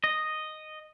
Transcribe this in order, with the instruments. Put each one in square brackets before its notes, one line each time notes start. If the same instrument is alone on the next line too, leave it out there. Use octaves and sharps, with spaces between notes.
[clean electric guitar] D#5